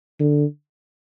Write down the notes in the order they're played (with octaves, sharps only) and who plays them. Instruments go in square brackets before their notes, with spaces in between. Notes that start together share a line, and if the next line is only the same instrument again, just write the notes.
[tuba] D3